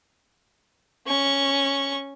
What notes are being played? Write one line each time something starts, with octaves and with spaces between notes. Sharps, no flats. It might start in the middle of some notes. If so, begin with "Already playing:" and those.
C#4 C#6